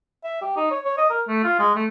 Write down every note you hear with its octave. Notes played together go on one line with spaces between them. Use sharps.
E5
G4
D#4
C#5
C#5
D#5
A#4
A3
F4
G#3
A3